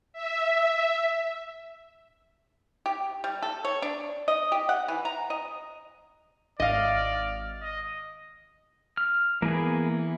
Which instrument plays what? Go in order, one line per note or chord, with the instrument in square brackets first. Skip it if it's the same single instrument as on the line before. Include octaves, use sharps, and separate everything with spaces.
[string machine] E5
[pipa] G4
G3
A4
C#5
D4
D#5
G4
F#5
E3
A#5
D#5
[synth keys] G#1 F6 [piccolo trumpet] D5 [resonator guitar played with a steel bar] D#5 F5
[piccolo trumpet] D#5
[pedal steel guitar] F6
[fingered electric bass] E3 [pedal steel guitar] A#3 B3 G#4